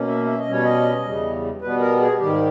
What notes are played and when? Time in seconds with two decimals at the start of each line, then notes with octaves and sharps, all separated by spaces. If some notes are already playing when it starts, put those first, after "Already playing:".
Already playing: B2 A#3 C#4
0.08 E5
0.26 E5
0.39 D#5
0.47 B2 G3 C#4 C#5
0.64 D#5
1.04 E2 C#3 G3
1.62 B2 G3 B3 B4
1.80 A#4
2.00 G#4
2.19 G#2 D#3 G3 G4